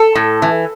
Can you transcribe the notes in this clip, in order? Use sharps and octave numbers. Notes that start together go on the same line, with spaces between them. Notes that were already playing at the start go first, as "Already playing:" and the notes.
Already playing: A4
A2
E3